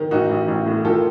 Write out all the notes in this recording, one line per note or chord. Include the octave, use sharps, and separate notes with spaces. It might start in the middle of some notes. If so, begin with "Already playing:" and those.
Already playing: D#3
A1 D#4 F#4
A1
A1
A2
D#3 F4 A4